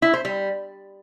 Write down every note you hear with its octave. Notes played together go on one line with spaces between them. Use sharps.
E4
C5
G3